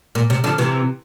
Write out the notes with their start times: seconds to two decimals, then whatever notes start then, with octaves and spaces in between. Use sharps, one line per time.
0.15 A#2
0.30 C3
0.44 D3 F3
0.58 C3 E3